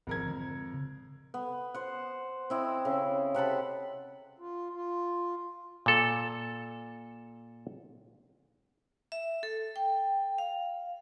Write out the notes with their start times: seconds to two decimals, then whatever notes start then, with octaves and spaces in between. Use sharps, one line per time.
0.07 G#1 F2 F3 A#4 G#6
0.25 D3 E3 G#3
0.74 C#3
1.34 B3
1.74 C5 F#5
2.50 C4 E4 D#5
2.85 C#3
3.34 C3 F#5 A5 B5
4.39 F4
4.73 F4
5.86 A#2 A4
9.12 E5
9.43 A4
9.76 G5
10.38 F5